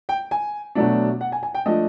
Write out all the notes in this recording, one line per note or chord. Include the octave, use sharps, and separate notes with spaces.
G5
G#5
B2 F#3 A3 D4
F#5
G#5
G#5
G5
F3 A3 D4 D#5